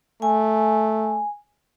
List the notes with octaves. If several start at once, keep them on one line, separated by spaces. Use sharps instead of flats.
A3 G#5